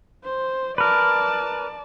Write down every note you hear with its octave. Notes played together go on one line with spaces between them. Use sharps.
C5
A#4 B4 D5 A5